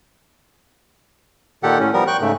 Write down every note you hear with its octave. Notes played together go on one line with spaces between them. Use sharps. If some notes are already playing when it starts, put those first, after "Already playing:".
A#2 D#3 G4 A4 F#5
A2 C#4
F3 G3 B3 A#4
G5 C#6 F#6
G#2 C#3 A3